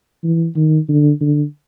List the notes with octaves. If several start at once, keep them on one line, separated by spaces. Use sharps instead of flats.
E3
D#3
D3
D3